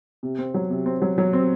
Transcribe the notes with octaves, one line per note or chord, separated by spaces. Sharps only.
C3
C4
F#3
C3
C4
F#3
F#3
C4